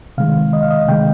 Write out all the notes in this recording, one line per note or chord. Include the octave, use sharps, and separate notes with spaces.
C3 D#3 G#3 F5
D#5
F5
D#5
C3 D#3 G#3 G5